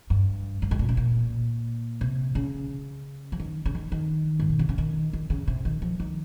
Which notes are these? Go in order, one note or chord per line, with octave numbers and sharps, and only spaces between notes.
G2
G2
G#2
A#2
C3
A#2
C3
C#3
F3
D#3
C#3
D#3
D#3
G#2
A#2
C3
C#3
D#3
D#3
C#3
C3
D#3
F3
D#3